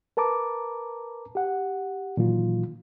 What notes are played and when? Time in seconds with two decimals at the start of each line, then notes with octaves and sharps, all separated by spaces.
0.17 A#4 B4 A5 A#5 D6
1.35 G4 F#5
2.17 A#2 D#3 E3 F#3 F4